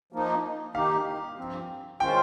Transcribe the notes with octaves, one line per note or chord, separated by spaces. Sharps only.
F3 A#3 D#4
D#3 A#3 D#4 G4 F5
G2 F3 C4
D#3 G#3 C#4 F4 C5 G5